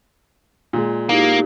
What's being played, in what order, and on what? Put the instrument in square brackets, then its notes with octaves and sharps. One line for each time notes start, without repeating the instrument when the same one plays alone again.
[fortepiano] A#2 G#3
[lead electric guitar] A#3 [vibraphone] D#4 E4 G4